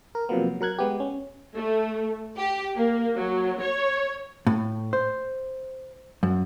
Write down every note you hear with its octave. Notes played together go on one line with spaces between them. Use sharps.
A#4
C3 F3 F#3 A#3 B3
F#3 A#4 F#6 G#6
G#3 B3 G4
C#4
A3
G4
A#3
F#3
C#5
A2
C5
F#2